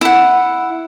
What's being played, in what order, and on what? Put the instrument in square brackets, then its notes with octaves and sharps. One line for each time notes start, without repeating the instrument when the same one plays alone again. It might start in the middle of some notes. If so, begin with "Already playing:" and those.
[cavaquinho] E4 F#5